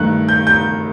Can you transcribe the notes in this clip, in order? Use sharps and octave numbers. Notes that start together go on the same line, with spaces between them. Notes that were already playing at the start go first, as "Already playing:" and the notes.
Already playing: G2 D#3 A3 F#6
G6
G6